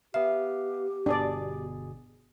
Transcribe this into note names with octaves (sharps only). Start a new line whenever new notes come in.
B3 G4 E5 F5
G1 B2 D4 G#4 D5